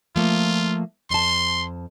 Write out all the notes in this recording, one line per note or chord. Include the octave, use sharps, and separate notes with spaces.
F3 A3 A#3 F4
F2 A5 C6